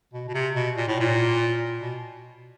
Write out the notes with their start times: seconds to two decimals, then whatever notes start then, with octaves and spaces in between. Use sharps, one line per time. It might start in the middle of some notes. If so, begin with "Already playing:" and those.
0.13 B2
0.28 B2
0.34 C3
0.55 B2
0.76 A#2
0.88 A2
1.00 A#2
1.82 B2